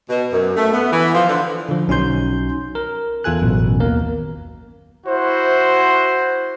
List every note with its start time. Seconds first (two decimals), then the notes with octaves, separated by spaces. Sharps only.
0.10 B2
0.32 F#2
0.56 A3
0.72 B3
0.93 E3
1.14 F3
1.29 D3
1.69 D3 F3
1.88 B1 C#4 D#4 F#4 C6 G6
2.75 A#4
3.24 E2 F4 A4 G#5 F#6
3.42 A1 F#2 B2
3.80 D#2 A#3 B3 A#4
5.07 E4 F#4 C5